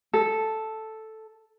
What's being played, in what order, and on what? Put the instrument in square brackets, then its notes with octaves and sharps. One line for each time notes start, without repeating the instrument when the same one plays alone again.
[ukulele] A4